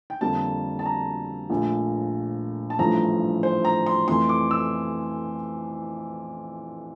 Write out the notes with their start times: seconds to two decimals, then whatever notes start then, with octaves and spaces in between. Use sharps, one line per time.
0.10 G5
0.21 F2 D3 G3 A#3 A5
0.79 A5
0.86 A#5
1.50 A#1 A#2 A3
2.70 A5
2.79 A1 G2 F3 A3 A#5
3.43 C5
3.65 A#5
3.86 C6
4.08 F2 E3 A3 C6
4.29 D6
4.51 E6